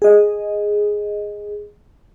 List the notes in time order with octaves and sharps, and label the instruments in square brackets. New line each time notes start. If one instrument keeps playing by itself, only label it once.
[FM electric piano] G#4 D#5